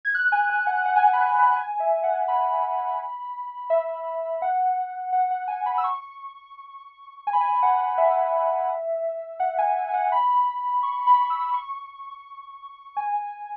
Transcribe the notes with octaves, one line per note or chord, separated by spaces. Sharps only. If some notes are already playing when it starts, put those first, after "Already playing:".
G#6
F#6
G#5
G#5
F#5
F#5
G#5
F#5
B5
G#5
B5
G#5
E5
F#5
B5
E5
F#5
F#5
F#5
G#5
B5
E6
C#6
G#5
B5
G#5
F#5
E5
F#5
G#5
G#5
G#5
F#5
B5
C#6
B5
E6
C#6
G#5